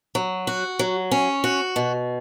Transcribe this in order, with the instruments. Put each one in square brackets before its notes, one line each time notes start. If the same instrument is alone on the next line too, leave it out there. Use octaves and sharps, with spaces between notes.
[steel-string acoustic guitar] F#3
F#4
F#3
C#4
F#4
B2